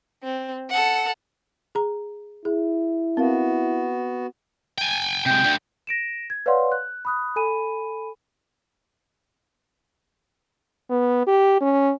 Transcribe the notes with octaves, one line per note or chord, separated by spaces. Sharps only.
C4
A4 F#5
G#4 A#5
E4 G#4
B3 C4 F#4 A#4 F5
G5 G#5
C3 G#3 G5
D2 D3
A#6 D7 E7
G#6
B4 C#5 D5 F5 F#5 C6
F#6
B5 D#6 F#6
A4 G#5 B5 D#7
B3
G4
C#4